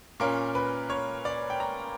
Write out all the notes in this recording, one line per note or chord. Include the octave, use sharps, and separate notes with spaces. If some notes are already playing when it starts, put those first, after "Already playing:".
A#2 A#3 C#4 A#4
B4
C#5
D5
G5
A#5